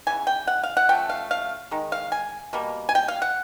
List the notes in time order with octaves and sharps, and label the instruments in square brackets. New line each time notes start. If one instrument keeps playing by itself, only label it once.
[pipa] C#3 E3 B3 G#5
G5
F#5
F5
F#5
F3 A3 C#4 G5
F5
F5
D#3 G#3
F5
G#5
B2 G3 A#3
G#5
G5
F5
F#5